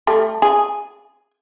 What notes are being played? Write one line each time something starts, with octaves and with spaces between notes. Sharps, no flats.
G3 A3
G#4